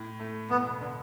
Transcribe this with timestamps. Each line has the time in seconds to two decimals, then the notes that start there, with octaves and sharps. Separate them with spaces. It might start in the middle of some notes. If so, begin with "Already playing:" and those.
Already playing: A2
0.20 A3
0.50 E1 B3
0.81 D3